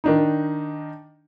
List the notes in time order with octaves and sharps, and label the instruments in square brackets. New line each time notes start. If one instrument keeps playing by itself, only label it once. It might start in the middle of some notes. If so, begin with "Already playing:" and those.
[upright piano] D#3 D4 D#4